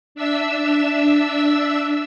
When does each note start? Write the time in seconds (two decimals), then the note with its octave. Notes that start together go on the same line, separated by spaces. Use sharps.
0.15 D4 E5 E6